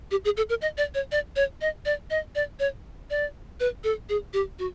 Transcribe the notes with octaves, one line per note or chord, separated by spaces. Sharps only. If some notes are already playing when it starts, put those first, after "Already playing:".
G4
G#4
A4
A#4
D#5
D5
C#5
D5
C#5
D#5
D5
D#5
D5
C#5
D5
B4
A4
G#4
G4
F#4